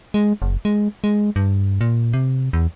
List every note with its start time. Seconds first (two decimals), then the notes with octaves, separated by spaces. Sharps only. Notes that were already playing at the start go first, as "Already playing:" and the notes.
0.14 G#3
0.42 F#1
0.65 G#3
1.04 G#3
1.36 G2
1.81 A#2
2.13 C3
2.53 E2